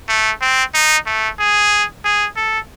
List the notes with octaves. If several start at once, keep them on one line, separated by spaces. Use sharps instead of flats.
A3
C4
D#4
A3
G#4
G#4
A4